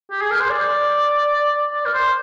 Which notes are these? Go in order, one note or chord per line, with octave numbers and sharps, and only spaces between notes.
G4
G#4
A#4
C5
D5
D5
A#4
C5